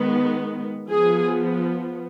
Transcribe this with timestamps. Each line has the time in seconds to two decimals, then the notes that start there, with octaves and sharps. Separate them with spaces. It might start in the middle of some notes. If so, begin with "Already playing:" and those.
Already playing: D#3 G#3 B3
0.92 F3 B3 G#4